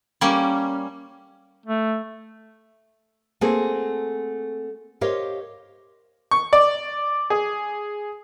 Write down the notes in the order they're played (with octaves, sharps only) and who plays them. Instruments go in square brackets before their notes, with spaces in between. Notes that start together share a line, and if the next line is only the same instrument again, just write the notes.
[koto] G3 A#3 C#4
[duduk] A3
[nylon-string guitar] A3 A#3 C4 F#4 G#4
G4 A#4 C5 C#5 D#5 F5
[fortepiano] C#6
D5
G#4